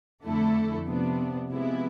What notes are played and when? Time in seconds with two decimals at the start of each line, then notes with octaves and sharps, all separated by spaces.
0.25 F2 D3 A3 E4 A4
0.87 C3 F3 B3 D4
1.49 C3 F3 G#3 B3 E4